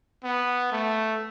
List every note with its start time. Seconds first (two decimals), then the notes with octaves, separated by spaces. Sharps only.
0.24 B3
0.72 A3